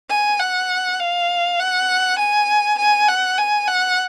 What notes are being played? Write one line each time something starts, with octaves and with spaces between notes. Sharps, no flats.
G#5
F#5
F5
F#5
G#5
G#5
F#5
G#5
F#5